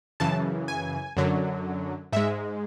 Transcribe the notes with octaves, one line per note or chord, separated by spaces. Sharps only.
F#2 C#3 E3 A5
G#5
F#2 D3 F#3
G#2 G#3 E5